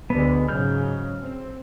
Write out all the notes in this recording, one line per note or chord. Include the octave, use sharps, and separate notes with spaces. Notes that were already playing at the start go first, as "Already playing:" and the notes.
D2 D3 G#3 B3
G#2 C#3 F#3 F6 G6
C4